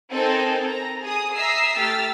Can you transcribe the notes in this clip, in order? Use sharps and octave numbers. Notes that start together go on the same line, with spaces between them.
C4 D#4 A4 A#4 G#5
A#5
G#4 D#6
E5 A#5 D#6 E6 C7
A3 G4 E6 F6 A6 B6